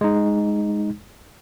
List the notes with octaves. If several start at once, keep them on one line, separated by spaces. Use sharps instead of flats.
G#3 D#4